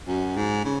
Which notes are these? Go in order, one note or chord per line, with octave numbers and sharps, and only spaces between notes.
F#2
G#2
C#3